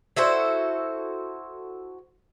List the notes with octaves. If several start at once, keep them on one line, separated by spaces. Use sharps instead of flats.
E4 F#4 A4 C5